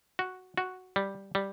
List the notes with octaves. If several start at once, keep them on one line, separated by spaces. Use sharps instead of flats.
F#4
F#4
G3
G3